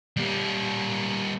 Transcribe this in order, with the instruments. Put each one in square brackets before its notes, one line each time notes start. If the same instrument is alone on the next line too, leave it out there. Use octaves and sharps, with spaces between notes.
[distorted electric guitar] G3 A#3